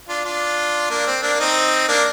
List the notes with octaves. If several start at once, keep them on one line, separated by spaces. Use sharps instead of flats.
D4 F4
D4 F4
A#3 D4
C4
A#3 D4
C4 D#4
A#3 D4